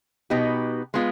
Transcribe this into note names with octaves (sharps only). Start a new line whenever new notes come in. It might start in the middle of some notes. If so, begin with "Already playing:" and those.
B2 B3 D#4 G4
G#3 B3 F4